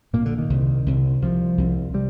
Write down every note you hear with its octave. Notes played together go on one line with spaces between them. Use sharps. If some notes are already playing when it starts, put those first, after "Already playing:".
A#1 A#2 A#3
D3
D#3
C2 C3
C2 C3
C2 C3 F3
C2 C3
C3 G3